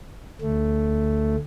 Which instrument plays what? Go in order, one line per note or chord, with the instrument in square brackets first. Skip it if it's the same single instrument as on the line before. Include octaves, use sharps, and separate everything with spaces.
[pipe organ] D2 A3